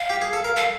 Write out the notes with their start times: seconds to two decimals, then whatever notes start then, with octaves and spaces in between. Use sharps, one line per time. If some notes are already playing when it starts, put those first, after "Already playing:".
Already playing: F5
0.10 G4
0.22 G#4
0.33 A4
0.45 A#4
0.56 A4 F5